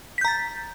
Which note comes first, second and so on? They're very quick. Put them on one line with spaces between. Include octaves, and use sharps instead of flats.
B6 G6 A#5 A6